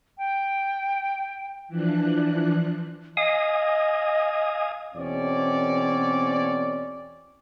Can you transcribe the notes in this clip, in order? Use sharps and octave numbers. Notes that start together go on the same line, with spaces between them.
G5
E3 F3 D4 F#6
D#5 F5 G#5 D#6
E2 B2 C4 C#4 C#5 D5